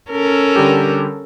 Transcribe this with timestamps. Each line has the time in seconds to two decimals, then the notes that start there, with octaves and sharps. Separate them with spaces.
0.11 C#4 A4 A#4
0.56 D3 G3 G4